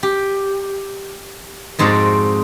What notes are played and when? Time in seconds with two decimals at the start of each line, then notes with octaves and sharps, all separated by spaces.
0.03 G4
1.79 F2 G#2 C4 D#4 F#4 D5